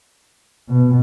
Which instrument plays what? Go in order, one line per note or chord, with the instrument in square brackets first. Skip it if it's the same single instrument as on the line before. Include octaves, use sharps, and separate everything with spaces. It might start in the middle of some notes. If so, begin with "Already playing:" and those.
[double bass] B2